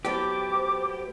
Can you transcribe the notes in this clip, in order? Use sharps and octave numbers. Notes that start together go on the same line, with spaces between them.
F#3 A3 B3 G4 C5 D6